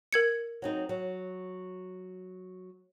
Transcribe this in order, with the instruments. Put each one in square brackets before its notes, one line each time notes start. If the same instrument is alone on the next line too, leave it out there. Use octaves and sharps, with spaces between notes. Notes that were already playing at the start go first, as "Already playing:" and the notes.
[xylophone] A#4 G#6 C#7
[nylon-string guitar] F#3 C4 D#4
F#3